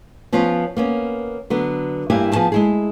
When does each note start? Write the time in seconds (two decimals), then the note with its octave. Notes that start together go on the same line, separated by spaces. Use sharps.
0.32 F3 B3 C#4 F4
0.77 A#3 B3 C#4
1.50 D3 F#3 B3
2.10 G2 A#3 E4 G4 G#5
2.32 F3 B3 G#4 G#5 A5
2.52 G#3 E4 G#4